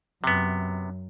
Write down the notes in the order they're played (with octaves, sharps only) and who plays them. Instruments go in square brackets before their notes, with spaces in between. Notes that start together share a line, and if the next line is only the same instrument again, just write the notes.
[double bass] F#2 [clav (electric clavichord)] C3 B3